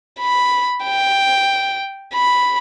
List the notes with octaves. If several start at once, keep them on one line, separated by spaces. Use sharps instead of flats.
B5
G5
B5